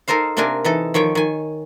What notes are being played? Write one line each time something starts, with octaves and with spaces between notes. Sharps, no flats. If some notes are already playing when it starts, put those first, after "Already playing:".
D#4 A4 A#4 C5 F5
C3 A#3 C4 D4 A#4 G#5
E3 D#4 A4
D#3 F3 C#5 G5
D#3 G#5